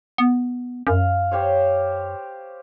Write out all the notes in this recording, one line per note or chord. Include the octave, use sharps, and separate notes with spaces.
B3
F#2 F5
G4 C5 C#5